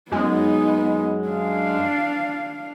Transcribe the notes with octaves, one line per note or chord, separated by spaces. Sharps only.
F#2 G#3 B3 D#4
D4 F5